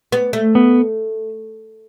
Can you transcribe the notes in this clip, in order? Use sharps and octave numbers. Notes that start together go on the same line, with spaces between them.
B3
A3
B3